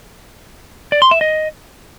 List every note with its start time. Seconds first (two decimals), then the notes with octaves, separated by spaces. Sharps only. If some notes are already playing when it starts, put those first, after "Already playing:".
0.92 D5
1.02 C6
1.11 E5
1.21 D#5